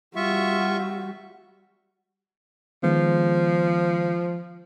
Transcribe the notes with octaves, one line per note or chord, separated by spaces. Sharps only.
G3 F4 F#4 E5 C#6
D#3 F3 G#3 B3